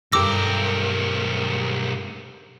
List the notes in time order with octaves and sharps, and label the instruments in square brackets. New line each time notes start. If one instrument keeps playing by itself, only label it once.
[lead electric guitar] B1 A#4 [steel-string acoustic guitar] G2 G4 A4 [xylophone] D6 E6 A#6